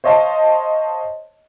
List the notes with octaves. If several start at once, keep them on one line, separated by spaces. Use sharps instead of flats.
C5 C#5 D#5 F5 A5